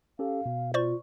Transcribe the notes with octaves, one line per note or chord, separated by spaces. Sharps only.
C#4 G4 A4 F5
B2
F4 C5 D5 C#6